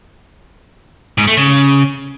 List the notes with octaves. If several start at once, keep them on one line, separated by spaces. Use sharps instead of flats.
G#2
A3
C#3